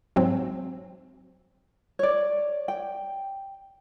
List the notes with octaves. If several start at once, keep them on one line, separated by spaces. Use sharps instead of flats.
G#2 F#3 C4
C#5 D5
G5